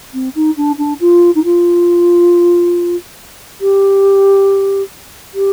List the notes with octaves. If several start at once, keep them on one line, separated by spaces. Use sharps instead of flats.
C4
D#4
D4
D4
F4
D#4
F4
G4
G4